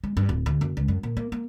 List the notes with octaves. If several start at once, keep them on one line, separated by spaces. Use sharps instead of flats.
G#3
G2
D1
D2
F#1
C#2
F#2
A#2
A#3
A#3